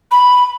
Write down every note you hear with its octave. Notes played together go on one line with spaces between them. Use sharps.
B5